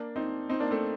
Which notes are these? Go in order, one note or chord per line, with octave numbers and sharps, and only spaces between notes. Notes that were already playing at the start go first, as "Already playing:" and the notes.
Already playing: A#3 D4
C4 D#4
C4 D#4
A#3 D4
A3 C4